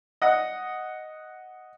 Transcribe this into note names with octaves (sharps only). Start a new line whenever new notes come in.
D#5 F#5